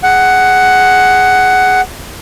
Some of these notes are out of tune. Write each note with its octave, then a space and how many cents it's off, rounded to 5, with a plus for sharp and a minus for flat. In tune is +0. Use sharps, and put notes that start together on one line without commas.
G#4 -5 F#5 +10